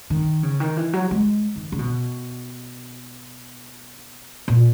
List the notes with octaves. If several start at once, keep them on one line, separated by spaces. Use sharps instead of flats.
D#3
C#3
D#3
E3
F#3
G#3
D#3
C#3
B2
A#2